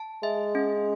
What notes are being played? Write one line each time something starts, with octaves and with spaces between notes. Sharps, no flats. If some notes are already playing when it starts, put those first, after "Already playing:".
Already playing: A5
G#3 E5
C#4